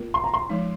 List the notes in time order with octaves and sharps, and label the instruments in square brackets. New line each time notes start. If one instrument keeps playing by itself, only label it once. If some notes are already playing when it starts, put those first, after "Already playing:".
Already playing: [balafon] A#3 F4 A#4
[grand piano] C6
A#5
C6
[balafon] F3 G#3 D#4